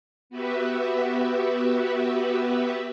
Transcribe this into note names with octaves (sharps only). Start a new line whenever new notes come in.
B3 F#4 G4 B4 E5